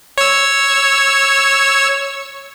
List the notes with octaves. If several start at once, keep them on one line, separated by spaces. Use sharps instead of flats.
C#5 E6